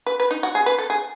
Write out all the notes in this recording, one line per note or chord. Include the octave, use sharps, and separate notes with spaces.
B4
B4
D#4
F#4
G#4
B4
A4
G#4